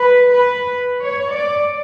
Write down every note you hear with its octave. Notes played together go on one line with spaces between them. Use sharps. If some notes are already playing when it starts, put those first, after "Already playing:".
Already playing: B4
B4
C#5
D5